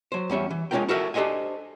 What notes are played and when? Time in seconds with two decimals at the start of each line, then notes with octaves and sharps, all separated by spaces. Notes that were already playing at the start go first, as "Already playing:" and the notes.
0.12 F#3 C5
0.30 E2 G3 C#4 E5
0.51 E3
0.71 G#3 A#3 C#4 F4 A#4 G5
0.88 E4 F#4 A4 A#4 E5
1.14 D4 G4 A4 C5 D#5 G#5